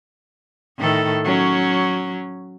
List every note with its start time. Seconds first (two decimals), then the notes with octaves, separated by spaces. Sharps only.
0.78 A2 D#3 A4
1.24 F#3 C#4